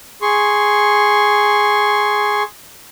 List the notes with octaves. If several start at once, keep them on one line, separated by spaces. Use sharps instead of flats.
G#4 C6 C#6